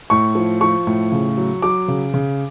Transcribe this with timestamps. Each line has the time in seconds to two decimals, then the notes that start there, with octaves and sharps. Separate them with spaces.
0.10 A2 C#6
0.35 F3
0.61 F3 C#6
0.87 A2
1.12 C#3
1.38 F#3
1.62 F#3 D6
1.88 C#3
2.14 C#3